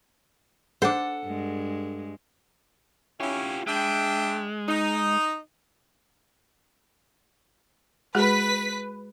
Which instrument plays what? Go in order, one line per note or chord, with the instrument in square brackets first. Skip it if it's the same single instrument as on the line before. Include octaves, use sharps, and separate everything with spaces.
[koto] D4 C5 [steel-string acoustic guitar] A4 F#5
[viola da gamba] G2 G#3
[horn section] C#4 E4 [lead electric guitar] F4 G4
[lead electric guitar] G#3 [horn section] D4 E5 G5
[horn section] D#4
[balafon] G#3 F#4 G#4 [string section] B4 B6